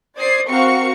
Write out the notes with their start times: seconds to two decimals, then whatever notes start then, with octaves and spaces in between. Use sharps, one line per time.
0.16 C5 D5 D#6 G#6 C7
0.49 C4 F#4 A#4 F5 C#6 C#7